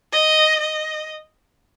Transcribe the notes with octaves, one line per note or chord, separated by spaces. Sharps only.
D#5
D#5